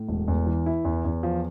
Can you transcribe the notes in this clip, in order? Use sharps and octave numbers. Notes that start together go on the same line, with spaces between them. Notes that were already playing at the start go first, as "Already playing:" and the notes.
Already playing: A2
E1
E2
E3
E4
E2
E2
F3